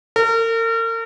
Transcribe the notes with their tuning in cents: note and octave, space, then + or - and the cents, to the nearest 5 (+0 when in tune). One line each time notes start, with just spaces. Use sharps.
A#4 -40